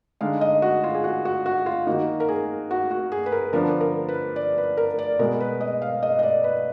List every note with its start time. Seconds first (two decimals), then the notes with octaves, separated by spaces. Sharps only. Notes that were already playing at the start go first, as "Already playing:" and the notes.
0.21 D3 G#3 D#4 F5
0.41 D#5
0.62 F#4
0.84 F4
0.94 G#4
1.04 F#4
1.25 F#4
1.46 F#4
1.66 F4
1.87 D#3 A#3 D#4 F#4
2.20 A#4
2.29 G#4
2.71 F#4
2.91 F#4
3.12 G#4
3.26 B4
3.32 A#4
3.53 D3 F3 B3 D4 A#4
3.81 A#4
4.08 B4
4.36 D5
4.58 B4
4.77 A#4
4.99 D5
5.19 B2 G#3 B3 A#4
5.40 B4
5.61 D#5
5.82 F5
6.03 D#5
6.19 D#5
6.23 D5
6.44 B4